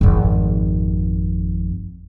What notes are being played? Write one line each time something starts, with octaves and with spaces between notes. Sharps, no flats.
G#1 F2